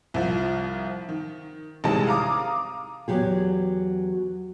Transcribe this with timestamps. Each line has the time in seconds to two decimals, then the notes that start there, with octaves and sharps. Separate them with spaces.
0.14 C2 F3
1.09 D#3
1.84 A1 C3 D#3 G3 G#3 A5
2.07 F5 A#5 D6 D#6
3.08 E2 F#3 G4 G#4